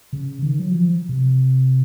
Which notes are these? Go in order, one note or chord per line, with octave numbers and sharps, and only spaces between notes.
C#3
D#3
F#3
F3
C3